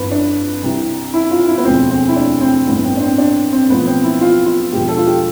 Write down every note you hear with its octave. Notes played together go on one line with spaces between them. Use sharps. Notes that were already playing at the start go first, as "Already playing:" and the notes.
Already playing: G1 F2 E3 B4
D4
C2 C3 E3
E4
F4
E4
B3
E1 D2 D3 F3 C4
C4
E4
D4
C4
A1 G2 E3 B3
C4
D4
C4
D4
C4
B1 A2 F3 B3
C4
E4
F4
F4
E1 E2 D3 F3 G4
A4
F4
G4